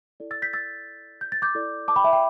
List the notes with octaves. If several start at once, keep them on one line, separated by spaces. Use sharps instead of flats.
E4 A4 D5
E6 A6
G6 B6
E6 A6
G6
A6
D6 G6
E4 A4 D5
A5 D6
G5 B5
E5 A5
G5 B5